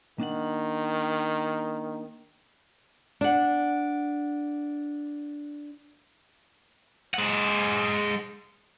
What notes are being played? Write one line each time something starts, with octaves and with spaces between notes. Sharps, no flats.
D#3 A#3 D4 F#5
D4 F#5
G#3 F#5